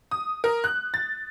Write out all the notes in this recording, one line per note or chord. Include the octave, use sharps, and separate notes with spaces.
D#6
A#4
F#6
A6